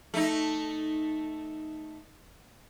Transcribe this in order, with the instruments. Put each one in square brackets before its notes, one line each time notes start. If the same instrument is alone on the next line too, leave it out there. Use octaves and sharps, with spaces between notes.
[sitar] A3 D#4